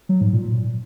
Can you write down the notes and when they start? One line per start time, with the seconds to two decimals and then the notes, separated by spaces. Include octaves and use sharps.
0.09 F#3
0.21 G#2
0.33 A#2